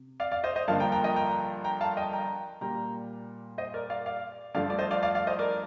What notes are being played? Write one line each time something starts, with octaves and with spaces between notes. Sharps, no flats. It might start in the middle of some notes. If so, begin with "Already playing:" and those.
Already playing: C3
D5 F5
D5 F5
C5 D#5
C5 D#5
G2 D3 F3 A#3 F5 A5
G5 A#5
G5 A#5
D#5 G5
G5 A#5
G5 A#5
F5 A5
D#5 G5
G5 A#5
A#2 G3 A#3 G5 A#5
C5 D#5
A#4 D5
D5 F5
D5 F5
G2 F3 A3 D5 F5
D5
C5 D#5
D5 F5
D5 F5
D5 F5
C5 D#5
A#4 D5